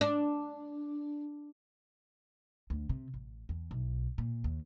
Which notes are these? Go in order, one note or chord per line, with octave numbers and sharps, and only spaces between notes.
D4
D2
C3
A1
E2
B1
A#2
D#2